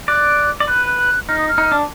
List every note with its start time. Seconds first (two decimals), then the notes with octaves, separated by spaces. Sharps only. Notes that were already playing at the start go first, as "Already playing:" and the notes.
0.08 D5 F#6
0.60 D5
0.68 B4 F#6
0.99 F#6
1.29 D#4 F6
1.38 D#6
1.49 F6
1.58 D#4
1.72 D4